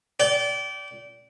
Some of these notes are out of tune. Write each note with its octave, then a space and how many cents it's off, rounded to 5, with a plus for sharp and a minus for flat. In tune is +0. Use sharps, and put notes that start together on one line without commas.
D5 -25 G5 -25